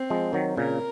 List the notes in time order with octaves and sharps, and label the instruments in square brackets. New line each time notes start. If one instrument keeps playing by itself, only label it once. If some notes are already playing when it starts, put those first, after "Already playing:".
Already playing: [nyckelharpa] C4
[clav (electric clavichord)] F3 G#3
D#3 F#3
[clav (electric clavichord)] A#2 C#3 [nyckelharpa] A#4